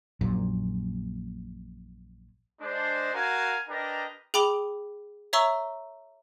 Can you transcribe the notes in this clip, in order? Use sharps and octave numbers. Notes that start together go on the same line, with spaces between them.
A#1 F#2 A#2
G#3 D4 C5
F#4 A#4 F5 G#5
D4 G4 A#4 B4 D#5 A#5
G#4 G5 B5 D6 F7 G7
C#5 E5 A#5 C#6 E6 G7